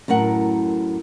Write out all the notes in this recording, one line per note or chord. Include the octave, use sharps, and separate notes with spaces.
F#2 A2 A#4 F#5